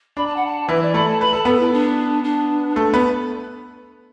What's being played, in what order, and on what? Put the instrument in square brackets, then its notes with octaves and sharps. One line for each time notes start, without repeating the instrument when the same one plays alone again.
[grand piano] D4 [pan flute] B5
[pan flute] A5
F#5
A5
[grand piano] E3 E4 [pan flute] B4
[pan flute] D5
[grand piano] A3 A4 [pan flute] B5
[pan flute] A5
[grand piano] B4 [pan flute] B5
[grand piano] A4 [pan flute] A5
[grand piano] B3 B4 [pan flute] A4
[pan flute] E4
D4
D4
[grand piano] A3 A4
B3 B4